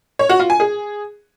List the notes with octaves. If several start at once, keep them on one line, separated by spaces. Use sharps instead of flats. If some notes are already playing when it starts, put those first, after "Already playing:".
C#5
F#4
F4
G#5
G#4